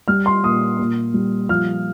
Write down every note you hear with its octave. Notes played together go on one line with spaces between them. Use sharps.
G3 F6
C6
A#2 D#6
A#2
G3
F3 F6